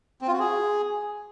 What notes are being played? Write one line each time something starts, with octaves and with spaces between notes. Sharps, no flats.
C4
F4
F#4
G#4